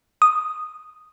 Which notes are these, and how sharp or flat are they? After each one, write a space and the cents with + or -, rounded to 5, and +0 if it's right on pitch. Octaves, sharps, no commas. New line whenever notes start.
D#6 -5